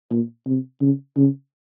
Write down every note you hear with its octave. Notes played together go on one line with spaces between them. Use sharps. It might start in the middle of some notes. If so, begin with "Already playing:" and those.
A#2
C3
C#3
C#3